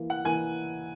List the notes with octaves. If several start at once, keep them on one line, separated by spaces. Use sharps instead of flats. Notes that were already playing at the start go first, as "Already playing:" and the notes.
Already playing: E3 A#3 E4 A#4
F#5
E3 A#3 E4 A#4 G#5